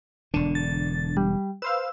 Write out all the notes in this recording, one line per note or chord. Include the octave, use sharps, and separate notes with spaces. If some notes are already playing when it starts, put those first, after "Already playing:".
E1 D3 D4
A6
G3
B4 C5 F5 E6